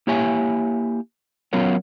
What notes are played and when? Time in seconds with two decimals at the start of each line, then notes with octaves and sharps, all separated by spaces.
0.07 A#3 E4 G4 C#5 E5 G#5
1.53 F#3 B3 C#4 F4 A#4 C#5